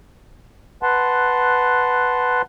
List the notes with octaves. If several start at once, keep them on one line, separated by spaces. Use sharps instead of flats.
B4 F#5 A5 C6